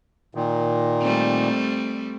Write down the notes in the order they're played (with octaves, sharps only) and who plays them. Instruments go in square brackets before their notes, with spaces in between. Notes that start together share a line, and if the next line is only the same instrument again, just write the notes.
[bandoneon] A#2 D#3
[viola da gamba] G3 A3 C4